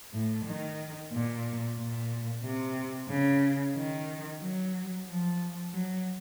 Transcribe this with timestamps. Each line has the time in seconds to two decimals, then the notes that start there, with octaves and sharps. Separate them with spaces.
0.13 A2
0.46 D#3
1.12 A#2
1.78 A#2
2.43 C3
3.09 C#3
3.76 D#3
4.42 F#3
5.08 F3
5.73 F#3